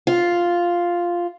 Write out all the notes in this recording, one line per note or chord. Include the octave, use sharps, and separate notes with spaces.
F4